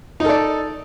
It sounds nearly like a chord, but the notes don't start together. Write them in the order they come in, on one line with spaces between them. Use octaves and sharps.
D#4 A4 D5